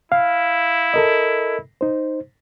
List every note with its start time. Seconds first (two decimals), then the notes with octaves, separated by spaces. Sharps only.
0.12 E4 F5
0.94 A4 A#4 D#5
1.81 D#4 C5